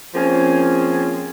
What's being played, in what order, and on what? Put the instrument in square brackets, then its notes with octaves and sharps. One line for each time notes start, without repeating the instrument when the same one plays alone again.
[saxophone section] F3 A#3 C4 C#4 G#4